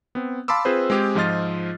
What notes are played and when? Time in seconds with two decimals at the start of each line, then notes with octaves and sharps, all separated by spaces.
0.15 B3 C4
0.48 F5 A5 B5 C6 D6 E6
0.65 C4 F4 G#4 B4 C5
0.90 G#3 C4 G4 G#4
1.15 G#2 F3 F4 D#5 F6 A6